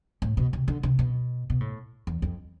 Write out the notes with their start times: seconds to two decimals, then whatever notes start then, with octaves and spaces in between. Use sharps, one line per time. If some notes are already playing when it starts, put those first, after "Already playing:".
0.22 A2
0.37 B2
0.53 C3
0.68 D3
0.83 C3
0.99 B2
1.50 B2
1.60 A2
2.07 E2
2.22 F2